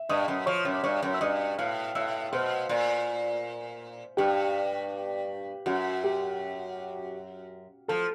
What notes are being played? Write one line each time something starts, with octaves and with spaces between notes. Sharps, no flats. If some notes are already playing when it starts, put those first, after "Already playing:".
Already playing: E5
G2 D#5 D#6
F#2
F3 C#5 C#6
F#2
D6
G2 C#5 C#6
F#2
E6
G2 D#5 D#6
A2 F5 F6
A2 E5 E6
B2 C5 C6
A#2
G2 G4 G5
F#2 F#4 F#5
G4 G5
F3 A4 A5